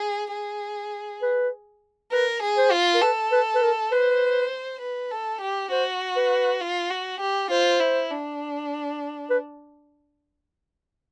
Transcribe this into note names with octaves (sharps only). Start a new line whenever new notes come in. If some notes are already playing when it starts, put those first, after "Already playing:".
Already playing: G#4
G#4
B4
A#4 B4
G#4
C5
F4
A#4
A4 B4
B4
B4
A#4
B4 C5
B4
A4
G4
F#4 C5
B4
F4
F#4
G4
F4 C5
E4
D4
B4